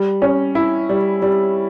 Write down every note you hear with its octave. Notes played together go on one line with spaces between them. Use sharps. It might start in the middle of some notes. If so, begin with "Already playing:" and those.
Already playing: G3
C#4
E4
G3
G3